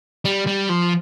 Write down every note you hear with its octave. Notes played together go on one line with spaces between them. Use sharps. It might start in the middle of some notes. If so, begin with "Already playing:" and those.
G3
G3
F3